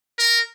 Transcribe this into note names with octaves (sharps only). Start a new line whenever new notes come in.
A#4